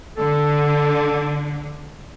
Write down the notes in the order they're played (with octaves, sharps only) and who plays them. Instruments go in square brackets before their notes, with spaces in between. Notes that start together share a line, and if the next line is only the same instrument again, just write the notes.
[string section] D3 [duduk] A4